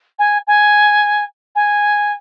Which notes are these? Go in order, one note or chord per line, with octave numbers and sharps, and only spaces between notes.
G#5
G#5
G#5